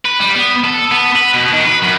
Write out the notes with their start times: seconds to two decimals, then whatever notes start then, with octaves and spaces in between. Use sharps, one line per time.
0.05 B4
0.20 G3
0.35 B3
0.64 A4
0.92 B3
1.16 B4
1.34 B2
1.53 D#3
1.66 B4
1.83 F#2